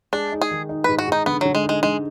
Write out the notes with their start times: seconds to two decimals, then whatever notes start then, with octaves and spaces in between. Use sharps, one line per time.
0.13 G#3 D4
0.32 D#4
0.42 G#4
0.51 D#3
0.69 D#4
0.84 G#2 B4
0.99 F#4
1.07 G#2 D#4
1.26 D3 B3
1.41 D3 F#3
1.55 G#3
1.64 D#4
1.69 G#3
1.82 D3 G#3